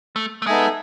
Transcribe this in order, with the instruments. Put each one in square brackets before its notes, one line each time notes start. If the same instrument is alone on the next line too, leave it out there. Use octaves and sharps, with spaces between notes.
[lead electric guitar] A3
A3
[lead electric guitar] G#3 [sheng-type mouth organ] B3 D#4 A4 E5 G#5